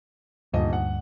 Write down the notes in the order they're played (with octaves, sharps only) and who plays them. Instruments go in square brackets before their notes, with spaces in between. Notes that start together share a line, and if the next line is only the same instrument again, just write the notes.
[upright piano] D#1 D#5 [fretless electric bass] D2 G2
[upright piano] F#5